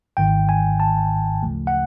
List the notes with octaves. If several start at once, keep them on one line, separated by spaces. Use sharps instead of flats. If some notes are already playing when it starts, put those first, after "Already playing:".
G#1 G#2 D#3 G5
G#5
A5
D2 C#3 F3 A3
F#5